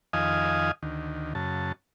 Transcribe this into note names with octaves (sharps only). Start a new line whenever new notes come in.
F2 D#3 D#5 F5 G#5 D#6
D2 D#3
F#2 C#3 A5